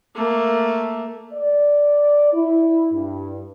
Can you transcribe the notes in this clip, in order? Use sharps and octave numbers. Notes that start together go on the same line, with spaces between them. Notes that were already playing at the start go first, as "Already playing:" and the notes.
A3 A#3
D5
E4
G2